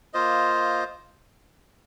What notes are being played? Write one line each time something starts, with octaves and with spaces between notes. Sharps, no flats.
A#3 F4 C5 D#5